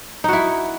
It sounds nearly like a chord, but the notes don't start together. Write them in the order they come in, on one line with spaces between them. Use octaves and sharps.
D#4 F#4 E4